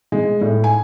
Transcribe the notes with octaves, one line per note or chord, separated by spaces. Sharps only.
G#3
A2
G#5